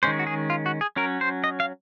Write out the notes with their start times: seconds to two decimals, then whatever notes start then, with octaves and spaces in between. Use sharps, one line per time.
0.03 D#3 G#3 C#4 C5
0.19 F#4
0.27 G#4
0.50 F4
0.66 F#4
0.81 G#4
0.96 F#3 C#4 A#4
1.21 C5
1.44 D#5
1.60 F5